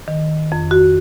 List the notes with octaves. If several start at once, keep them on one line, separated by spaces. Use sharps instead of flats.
D#3
F2
F#4